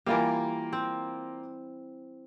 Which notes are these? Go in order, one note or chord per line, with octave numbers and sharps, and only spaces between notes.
E3 G3 A#3 F4 A#4
C4